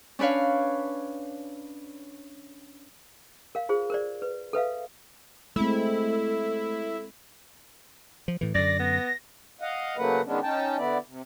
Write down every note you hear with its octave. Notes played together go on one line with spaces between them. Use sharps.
C#4 D4 B4 C#5 F5
A#4 F5
F4 G#4 C5
A#4 C5 D5
B4
A4 B4 E5 F5
G#3 A3 C4 E4 A4
F3
A2 E3
F#2 D3 D5 A#6
B3
D#5 F5 F#5
C#3 F#3 A3 A#3 B4 F#5
D#3 G#3 B3 C#4 D4
C#4 D#4 G5 A5
D3 B3 E4 D5
C3